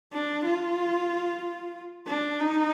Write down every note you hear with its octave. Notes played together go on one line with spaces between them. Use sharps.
D4
F4
D4
D#4